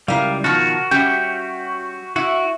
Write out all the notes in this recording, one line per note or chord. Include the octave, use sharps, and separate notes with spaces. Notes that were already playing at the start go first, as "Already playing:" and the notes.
C#2 G3 E4 A#4 F5
B2 D#3 F3 F#4 A#4 F#5 A5
G3 C#4 G4 E5 F#5 G5
E4 F#4